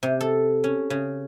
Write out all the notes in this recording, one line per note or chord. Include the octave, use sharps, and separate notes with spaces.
C3
A4
C#4
C#3